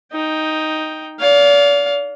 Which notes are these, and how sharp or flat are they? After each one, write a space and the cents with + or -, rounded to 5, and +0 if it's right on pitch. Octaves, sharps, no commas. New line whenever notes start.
D#4 +0 G5 +0
D5 -40 F5 +10